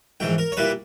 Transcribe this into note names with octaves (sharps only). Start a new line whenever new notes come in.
A#1 G#2 E3 G5
A#4
C#5
A#2 G3 A#3 E4 B4